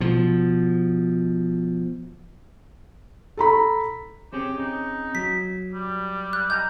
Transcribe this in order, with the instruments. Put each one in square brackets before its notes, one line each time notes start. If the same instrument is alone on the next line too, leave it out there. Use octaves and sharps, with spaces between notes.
[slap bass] B2 F3
[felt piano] A4 A#5 B5
[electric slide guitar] C4 C#4 G#4 [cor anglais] G4
[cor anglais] D#4
[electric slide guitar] F#3 [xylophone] B6
[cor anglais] G3
[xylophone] F#6
[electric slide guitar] D#5 G#5 A#5 [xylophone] G6